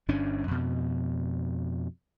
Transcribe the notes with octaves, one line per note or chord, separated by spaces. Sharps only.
G1 G2 C#4 D4
F2 B2